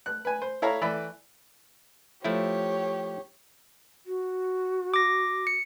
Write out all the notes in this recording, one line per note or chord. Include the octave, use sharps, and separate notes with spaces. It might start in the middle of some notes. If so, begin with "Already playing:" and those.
F#6
B4 G#5
C5
E4 A4 C#5 E5 F5 A#5
E3 A3 D5 E5 B5
F3 A3 E4 G4 C#5
F#4
D6 A#6
C#7